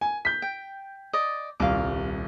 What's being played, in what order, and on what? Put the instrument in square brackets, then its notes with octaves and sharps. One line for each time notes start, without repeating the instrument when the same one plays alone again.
[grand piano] G#5
G6 B6
[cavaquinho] G5
D5 D#5
[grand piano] D#1 C2 [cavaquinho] F5 D6